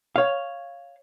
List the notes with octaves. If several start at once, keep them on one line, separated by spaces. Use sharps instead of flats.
C#5 F5